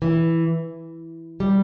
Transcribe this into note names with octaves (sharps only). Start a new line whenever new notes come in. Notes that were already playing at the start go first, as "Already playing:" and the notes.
E3
G3